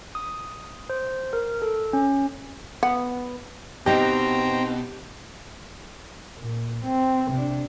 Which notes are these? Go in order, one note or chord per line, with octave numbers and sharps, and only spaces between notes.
D#6
C5
A#4
A4
C#4
B3 F#5
B2 C4 D#4 G4 C5 D#5 G5 A#5
A#2
C4
C3 D4